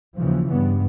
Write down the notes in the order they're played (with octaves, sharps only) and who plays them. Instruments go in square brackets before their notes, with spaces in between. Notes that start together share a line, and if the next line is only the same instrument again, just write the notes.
[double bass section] D#2 C#3 E3 F3
G2 B3